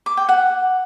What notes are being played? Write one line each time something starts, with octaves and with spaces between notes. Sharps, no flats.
D6
G5
F#5